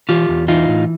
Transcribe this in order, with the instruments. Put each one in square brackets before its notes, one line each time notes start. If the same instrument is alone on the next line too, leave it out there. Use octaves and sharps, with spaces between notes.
[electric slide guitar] E3 F4 G4
E2
E3 D#4 F4
A2